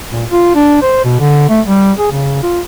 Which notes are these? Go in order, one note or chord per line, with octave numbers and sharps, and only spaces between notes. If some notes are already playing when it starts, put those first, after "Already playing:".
A#2
F4
D4
C5
B2
D3
A3
G3
G#4
C#3
F4